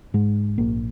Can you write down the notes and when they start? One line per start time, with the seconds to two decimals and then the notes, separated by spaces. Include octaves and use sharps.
0.14 G#2 G#3
0.58 A#1 A#3